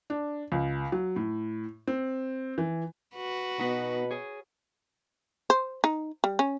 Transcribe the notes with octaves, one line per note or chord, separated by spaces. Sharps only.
D4
C#2
F#3
A2
C4
E3
F#4 B4
B2 B3 D#4
G#4 C#5
C5
D#4
G3
C#4